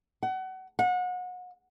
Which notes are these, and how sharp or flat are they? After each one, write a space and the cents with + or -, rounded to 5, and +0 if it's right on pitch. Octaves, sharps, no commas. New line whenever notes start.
F#5 +30
F#5 -30